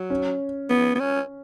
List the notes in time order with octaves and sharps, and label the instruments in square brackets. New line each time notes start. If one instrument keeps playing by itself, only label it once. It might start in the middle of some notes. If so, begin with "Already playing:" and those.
Already playing: [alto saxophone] F#3
[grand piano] C#4
[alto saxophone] B3
B3
C#4